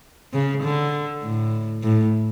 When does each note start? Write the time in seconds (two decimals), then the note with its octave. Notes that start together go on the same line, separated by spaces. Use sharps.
0.33 C#3
0.63 D3
1.23 A2
1.83 A2